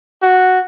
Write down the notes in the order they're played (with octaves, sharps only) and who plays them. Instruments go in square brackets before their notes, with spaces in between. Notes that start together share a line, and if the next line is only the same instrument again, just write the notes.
[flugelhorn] F#4